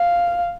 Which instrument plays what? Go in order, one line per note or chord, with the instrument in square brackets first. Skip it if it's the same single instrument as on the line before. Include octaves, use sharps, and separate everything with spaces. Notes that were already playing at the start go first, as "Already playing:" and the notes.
Already playing: [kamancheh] F5